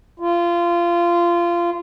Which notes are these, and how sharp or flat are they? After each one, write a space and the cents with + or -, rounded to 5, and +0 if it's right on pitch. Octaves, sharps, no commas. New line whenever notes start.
F4 -20